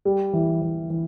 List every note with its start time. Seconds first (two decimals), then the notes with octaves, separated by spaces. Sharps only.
0.05 G3
0.33 E3
0.61 E3
0.90 E3